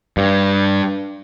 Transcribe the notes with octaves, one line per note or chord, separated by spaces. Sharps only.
G2